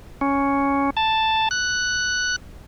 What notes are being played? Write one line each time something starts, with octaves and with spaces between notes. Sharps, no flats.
C#4
A5
F#6